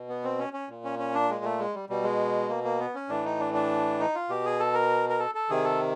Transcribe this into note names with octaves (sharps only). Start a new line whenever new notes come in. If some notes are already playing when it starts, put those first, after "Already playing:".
Already playing: B2
B3
C4
C#4
C#4
A#2
C#4
C#4
D4
G#3
A3
G#3
G3
B2 G3
G#3
A#3
A#3
B3
C#4
A2 E3 D4
D#4
D4
D4
D#4
F4
B2 G4
G#4
A4
A#4
A#4
A4
A4
C3 D#3 G#4
A4